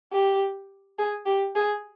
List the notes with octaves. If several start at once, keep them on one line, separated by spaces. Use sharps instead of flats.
G4
G#4
G4
G#4